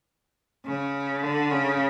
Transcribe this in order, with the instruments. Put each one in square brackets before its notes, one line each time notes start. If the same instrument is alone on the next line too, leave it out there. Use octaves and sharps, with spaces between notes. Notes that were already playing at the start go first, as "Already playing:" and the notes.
[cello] C#3
D3
C#3